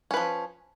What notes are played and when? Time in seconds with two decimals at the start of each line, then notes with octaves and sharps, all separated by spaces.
0.11 C#4
0.14 B4
0.17 F3